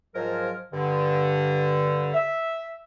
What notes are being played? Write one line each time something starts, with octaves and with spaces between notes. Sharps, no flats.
G#2 F3 F#3 A#4
G2 D3
E5